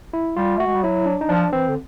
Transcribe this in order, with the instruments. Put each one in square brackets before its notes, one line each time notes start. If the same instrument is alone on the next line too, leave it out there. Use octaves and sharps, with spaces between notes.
[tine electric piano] E4
[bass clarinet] G3 [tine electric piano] F4
[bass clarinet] A3 [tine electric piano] F#4
[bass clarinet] G#3
G3
[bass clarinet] F#3 [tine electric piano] E4
[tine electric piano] D4
D#4
[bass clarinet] F3 [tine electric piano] D4
[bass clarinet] E3 [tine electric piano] C4
[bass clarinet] D3